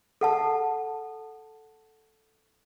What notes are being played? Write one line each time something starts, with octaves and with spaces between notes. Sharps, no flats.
A4 F#5 A5